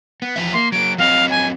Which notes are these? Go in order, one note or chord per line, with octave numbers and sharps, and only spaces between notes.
B3
E2 F3 E5
A#3 C6
F#3 A#3 D7
F#3 C4 D#5 F5
G#5